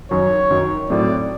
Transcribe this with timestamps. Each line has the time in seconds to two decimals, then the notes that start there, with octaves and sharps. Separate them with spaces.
0.11 F#2 D#3 F#3 C#5
0.51 F#2 D#3 F#3
0.90 A2 F#3 A3 C4 D5